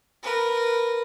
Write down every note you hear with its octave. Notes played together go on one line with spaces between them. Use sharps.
A#4 B4